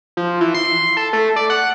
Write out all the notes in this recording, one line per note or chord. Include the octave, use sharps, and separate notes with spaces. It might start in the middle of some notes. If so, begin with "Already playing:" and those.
F3
E3
C6
A4
A3
D5
F#5